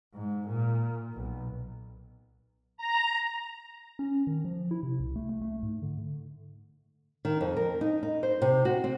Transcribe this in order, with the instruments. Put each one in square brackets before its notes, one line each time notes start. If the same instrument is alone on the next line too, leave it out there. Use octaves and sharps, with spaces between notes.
[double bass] G#2
A#2
B1
[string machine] A#5
[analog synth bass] C#4
D#3
F3
E4
C3
C2
A3
A3
A3
G#2
D3
[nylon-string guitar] D#3
F2
A#4
D#4
D#4
C5
C3
F#4
C4